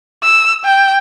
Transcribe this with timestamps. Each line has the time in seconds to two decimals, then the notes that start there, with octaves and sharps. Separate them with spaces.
0.23 E6
0.65 G5